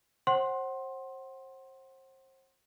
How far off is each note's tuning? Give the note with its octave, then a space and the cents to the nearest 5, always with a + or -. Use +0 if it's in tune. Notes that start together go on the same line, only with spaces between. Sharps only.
C5 +30 F#5 +20 C6 +15